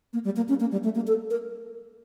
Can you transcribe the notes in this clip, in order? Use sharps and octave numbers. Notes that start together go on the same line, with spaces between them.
A#3
G3
A#3
C#4
A#3
G3
A3
A#3
A4
A#4